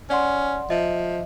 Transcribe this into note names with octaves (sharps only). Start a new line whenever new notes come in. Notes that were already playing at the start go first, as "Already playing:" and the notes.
C#4 D5 F#5 C6
F3 D#5 E5